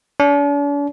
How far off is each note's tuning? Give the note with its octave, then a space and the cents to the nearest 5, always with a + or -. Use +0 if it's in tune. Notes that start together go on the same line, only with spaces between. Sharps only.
D4 -45